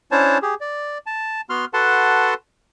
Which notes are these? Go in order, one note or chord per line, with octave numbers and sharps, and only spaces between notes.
C#4 D4 E4 C5 C#5 A5
G4 G#4
D5
A5
B3 F#4 C6 F6
F#4 A4 B4 F#5 A5 C6